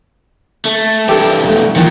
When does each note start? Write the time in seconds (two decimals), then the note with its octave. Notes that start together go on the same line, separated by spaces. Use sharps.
0.65 A3
1.09 G2 E3 G4 A4
1.43 B2 A3
1.76 A#2 D#3 E3